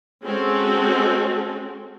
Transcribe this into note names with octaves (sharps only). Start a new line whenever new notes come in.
G#3 C4 C#4 F#4 A4